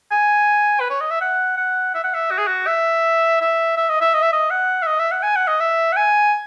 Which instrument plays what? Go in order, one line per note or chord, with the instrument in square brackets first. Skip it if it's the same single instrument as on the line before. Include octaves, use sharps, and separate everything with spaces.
[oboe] G#5
B4
C#5
D#5
E5
F#5
F#5
E5
F#5
E5
F#4
G#4
F#4
E5
E5
E5
D#5
E5
D#5
E5
D#5
F#5
E5
D#5
E5
F#5
G#5
F#5
D#5
E5
F#5
G#5